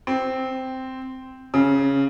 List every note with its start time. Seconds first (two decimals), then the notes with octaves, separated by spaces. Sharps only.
0.07 C4
1.54 C#3